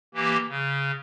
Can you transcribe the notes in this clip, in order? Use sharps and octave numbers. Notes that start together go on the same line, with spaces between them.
E3 A#3 G4
C#3